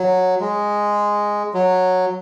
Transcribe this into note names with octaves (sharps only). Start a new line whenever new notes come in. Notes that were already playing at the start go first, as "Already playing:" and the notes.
Already playing: F#3
G#3
F#3